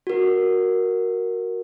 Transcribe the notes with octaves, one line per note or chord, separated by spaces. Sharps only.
F#4 A#4